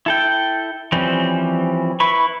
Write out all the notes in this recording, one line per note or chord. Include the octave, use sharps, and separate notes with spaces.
E4 A4 G5
E3 F3 G3 C4 C#4
E4 B4 B5 C#6